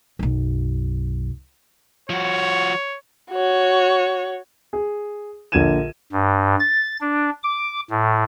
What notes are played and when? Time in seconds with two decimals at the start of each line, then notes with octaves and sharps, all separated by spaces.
0.19 B1 F#2
2.10 F3 F#4 C#5
3.31 F#4 C#5
4.73 G#4
5.52 A#1 D3 A#4 G#6 D#7 E7
6.12 G2
6.59 A6
7.01 D4
7.43 D6
7.90 A2